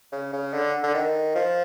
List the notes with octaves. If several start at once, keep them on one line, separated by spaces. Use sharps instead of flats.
C#3
C#3
D3
D3
D#3
F3